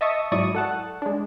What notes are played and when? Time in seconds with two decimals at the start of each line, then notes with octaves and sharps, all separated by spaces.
0.01 D#5 E5 A5 C#6 D#6
0.32 G#2 F#3 E4 D5 C#6 D#6
0.55 A4 F#5 A5
1.02 G#3 D4